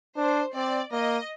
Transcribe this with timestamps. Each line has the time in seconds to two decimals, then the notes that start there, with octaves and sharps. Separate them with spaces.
0.17 D4 C5
0.55 C4 D5
0.92 A#3 D#5